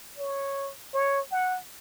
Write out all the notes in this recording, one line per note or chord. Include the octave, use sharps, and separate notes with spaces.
C#5
C#5
F#5